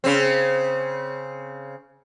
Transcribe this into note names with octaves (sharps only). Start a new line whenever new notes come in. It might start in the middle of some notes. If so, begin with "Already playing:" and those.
C#3 C4